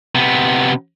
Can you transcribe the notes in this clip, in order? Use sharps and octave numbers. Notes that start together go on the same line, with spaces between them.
C3 B3